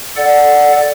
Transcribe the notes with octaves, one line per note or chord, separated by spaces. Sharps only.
A4 D5 F#5